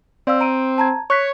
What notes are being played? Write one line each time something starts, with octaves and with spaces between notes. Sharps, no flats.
C4 D5 F5 E6
A#5 D7 D#7
A5 A#5 G#6
C#5 C#6 F#6 B6